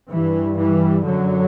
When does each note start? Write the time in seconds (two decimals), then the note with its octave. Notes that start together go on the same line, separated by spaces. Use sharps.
0.10 G2 E3
0.58 E3 G3
1.06 F#2 D3 F#3